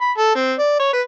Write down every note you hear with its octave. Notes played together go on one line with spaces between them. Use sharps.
B5
A4
C4
D5
C#5
B4